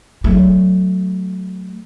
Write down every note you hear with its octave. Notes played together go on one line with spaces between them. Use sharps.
F#3 A3